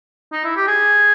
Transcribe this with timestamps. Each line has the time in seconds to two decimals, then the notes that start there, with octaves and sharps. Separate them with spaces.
0.32 D#4
0.44 E4
0.56 G4
0.68 G#4